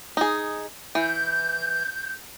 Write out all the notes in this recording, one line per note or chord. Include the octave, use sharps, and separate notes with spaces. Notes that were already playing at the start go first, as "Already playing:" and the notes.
D#4 G#4
E3 G6